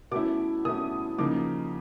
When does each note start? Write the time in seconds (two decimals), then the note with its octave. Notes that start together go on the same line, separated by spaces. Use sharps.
0.11 B2 F#3 A3 C#4 E4 D6
0.65 B2 F#3 A3 C#4 E4 D#6
1.18 C#3 F3 A#3 D#4 D6